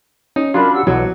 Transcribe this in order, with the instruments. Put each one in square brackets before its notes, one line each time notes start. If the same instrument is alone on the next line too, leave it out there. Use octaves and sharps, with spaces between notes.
[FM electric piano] C#4 [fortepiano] D#4
[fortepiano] F#3 D4 [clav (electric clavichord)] F4 D5 [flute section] A#4 B5
[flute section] G4 F#5 E6
[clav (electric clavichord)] B1 [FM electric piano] E3 [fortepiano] F#3 [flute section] D5 F#5